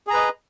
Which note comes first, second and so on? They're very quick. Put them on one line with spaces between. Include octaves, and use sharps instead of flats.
G#4 A#5 B4 D#5